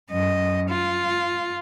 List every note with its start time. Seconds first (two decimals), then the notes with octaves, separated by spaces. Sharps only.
0.11 F#2 D#5
0.69 F4